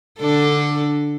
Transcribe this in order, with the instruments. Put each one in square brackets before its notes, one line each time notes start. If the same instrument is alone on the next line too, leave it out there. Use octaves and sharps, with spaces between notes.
[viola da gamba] D3 D4 A4